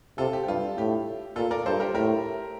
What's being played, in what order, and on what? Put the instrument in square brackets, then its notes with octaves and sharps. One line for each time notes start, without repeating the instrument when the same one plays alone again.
[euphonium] C3 [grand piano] F4 A4
[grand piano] G4
G4
[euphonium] G2 [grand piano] F4
[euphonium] A2 [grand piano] G4
[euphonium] A#2 [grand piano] F4 A4
[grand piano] A#4 D5
[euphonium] G2 [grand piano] A4 C5
[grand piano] G4 A#4
[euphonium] A2 [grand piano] G4 A#4